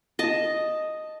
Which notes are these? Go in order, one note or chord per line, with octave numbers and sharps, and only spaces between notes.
D#5 A5